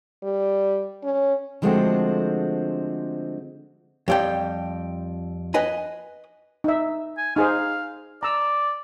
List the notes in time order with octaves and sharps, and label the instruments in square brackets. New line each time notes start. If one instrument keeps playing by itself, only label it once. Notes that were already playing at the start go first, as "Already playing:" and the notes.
[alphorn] G3
C#4
[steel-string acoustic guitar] D3 F3 G#3 A3 C4 F#4
[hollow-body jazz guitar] F2 G3 G5
B4 D#5 G#5 B5
[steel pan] D#4 E5
[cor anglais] G#5
[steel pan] D#4 G#4 C5 [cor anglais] F5
[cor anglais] D5 [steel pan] A#5 E6